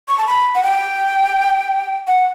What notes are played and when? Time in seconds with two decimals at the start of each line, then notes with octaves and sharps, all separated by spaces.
0.08 C#6
0.18 A5
0.27 B5
0.55 F#5
0.63 G5
2.07 F#5